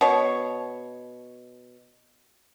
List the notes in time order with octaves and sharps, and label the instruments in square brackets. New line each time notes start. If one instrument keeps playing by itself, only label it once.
[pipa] B2 C#5